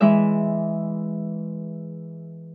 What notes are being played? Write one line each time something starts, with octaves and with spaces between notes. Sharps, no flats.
E3 G#3 E5